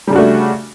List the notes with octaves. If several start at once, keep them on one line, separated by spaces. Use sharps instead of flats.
C#3 G3 A3 D4 F#4